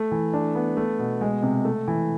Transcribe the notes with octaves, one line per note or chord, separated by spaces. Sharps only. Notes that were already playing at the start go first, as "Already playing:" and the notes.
Already playing: A3
E3
D4
B3
A3
B2
G#3
C3
A3
E3